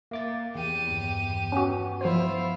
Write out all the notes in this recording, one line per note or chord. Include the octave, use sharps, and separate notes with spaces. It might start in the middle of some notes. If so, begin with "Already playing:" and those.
A#3 E5 D6 A6
E2 G4 D#7
G2 D#3
B3 C#4 F#4
F3 E4 F4 C5